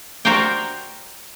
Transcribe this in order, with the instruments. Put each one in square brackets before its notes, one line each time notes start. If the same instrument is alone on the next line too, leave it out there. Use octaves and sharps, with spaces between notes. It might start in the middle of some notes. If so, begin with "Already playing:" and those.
[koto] F#4 A#4 C5 D5 F5 G5